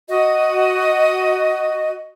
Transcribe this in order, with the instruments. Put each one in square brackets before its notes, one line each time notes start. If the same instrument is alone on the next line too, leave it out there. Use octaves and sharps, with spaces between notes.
[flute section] F#4 D#5